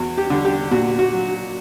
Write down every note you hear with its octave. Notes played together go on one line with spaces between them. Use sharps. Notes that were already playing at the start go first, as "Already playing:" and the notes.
Already playing: E2 F#4
G4
D3 G3
G4
A#2 F#4
F#4
F#3